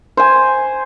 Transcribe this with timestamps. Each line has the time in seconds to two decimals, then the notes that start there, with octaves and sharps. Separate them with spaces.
0.17 C5 G#5